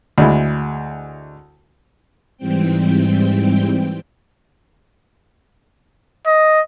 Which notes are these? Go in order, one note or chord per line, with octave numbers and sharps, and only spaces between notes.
D2 G#3 E4
G#2 E3 G3 C4 G5
D#5